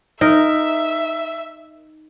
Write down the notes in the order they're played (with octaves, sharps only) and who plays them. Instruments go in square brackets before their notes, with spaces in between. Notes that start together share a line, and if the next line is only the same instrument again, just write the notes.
[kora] D#4 A#4 [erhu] E5